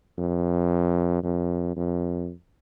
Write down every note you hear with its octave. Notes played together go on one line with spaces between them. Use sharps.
F2
F2
F2